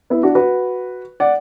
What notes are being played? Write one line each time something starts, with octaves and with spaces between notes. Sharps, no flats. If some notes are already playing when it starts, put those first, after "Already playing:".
B3 E4
D4 F#4
F#4 B4
D5 F#5